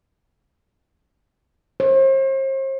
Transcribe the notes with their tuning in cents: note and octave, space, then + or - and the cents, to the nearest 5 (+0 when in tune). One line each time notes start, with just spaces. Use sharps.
C5 +40